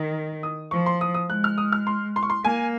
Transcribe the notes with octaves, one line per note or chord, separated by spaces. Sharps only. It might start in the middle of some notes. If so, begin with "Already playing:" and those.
Already playing: D#3
D#6
F3 C#6
C6
D#6
D#6
G#3 F#6
F6
D#6
F6
C6
C6
C#6
C6
A#3 G#5